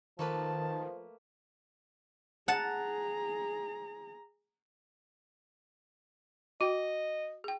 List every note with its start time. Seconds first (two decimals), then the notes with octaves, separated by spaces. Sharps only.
0.19 D#3 F3 A3 A#3 B4 A5
2.48 G#4 F#5 A5 A#5
6.61 F#4 D#5 G5
7.44 G#4 G5